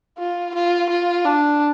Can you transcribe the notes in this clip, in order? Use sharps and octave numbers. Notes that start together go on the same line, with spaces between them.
F4
F4
F4
D4